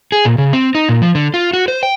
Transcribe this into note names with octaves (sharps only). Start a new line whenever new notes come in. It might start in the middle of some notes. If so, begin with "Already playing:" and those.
G#4
A#2
C#3
C4
D#4
A#2
F3
D3
F4
F#4
C5
G5